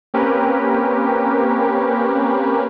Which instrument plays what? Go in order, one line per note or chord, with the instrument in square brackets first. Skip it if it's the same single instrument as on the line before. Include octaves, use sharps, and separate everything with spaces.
[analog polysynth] A#3 C4 C#4 G4 A#4 B4